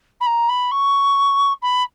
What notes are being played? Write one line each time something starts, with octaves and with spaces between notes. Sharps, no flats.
B5
A#5
B5
C#6
B5